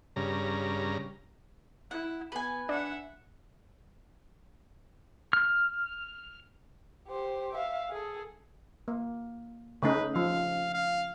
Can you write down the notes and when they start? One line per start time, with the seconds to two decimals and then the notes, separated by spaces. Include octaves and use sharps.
0.16 G2 C#3 A#5
1.91 E4 F#5
2.32 B3 B4 G#5
2.69 D4 E5 F#5
5.33 F6
7.08 G4 C5
7.55 E5 F5
7.91 G#4 A4
8.88 A#3
9.83 C#3 A3 D#4 B4
10.16 F3 F5
10.74 F5